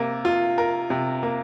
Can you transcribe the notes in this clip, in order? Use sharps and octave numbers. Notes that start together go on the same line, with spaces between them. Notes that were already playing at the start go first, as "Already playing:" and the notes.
Already playing: C3 A#3
F4
A#4
C3
A#3